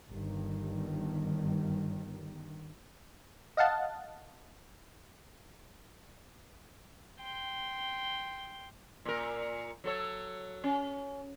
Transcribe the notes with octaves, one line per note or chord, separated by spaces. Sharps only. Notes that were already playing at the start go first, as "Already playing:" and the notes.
G1 G2 D#3
D#5 F5 F#5 A5
G5 C6
A#2 A#4
F#3 A4 C#5
C#4